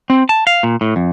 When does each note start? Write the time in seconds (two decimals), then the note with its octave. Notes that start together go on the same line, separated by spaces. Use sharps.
0.10 C4
0.29 A5
0.47 F5
0.63 A#2
0.81 A2
0.96 F2